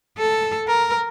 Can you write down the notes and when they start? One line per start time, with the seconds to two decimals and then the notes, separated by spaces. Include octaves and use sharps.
0.18 A4
0.67 A#4